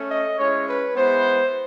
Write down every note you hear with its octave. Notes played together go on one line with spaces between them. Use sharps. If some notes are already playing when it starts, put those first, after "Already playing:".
Already playing: A3 C#4
D#5
G#3 C#4 E4 C#5
B4
G#3 B3 E4 C5